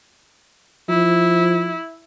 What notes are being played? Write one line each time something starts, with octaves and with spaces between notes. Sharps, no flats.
F3 E4